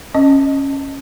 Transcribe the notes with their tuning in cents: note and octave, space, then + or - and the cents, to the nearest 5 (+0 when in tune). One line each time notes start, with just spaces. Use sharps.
C#4 -15 D#5 +0